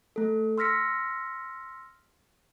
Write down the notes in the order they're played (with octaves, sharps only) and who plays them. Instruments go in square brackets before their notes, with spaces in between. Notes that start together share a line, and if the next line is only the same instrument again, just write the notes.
[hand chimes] A3 A4
C6 E6 F6 A#6 B6 C#7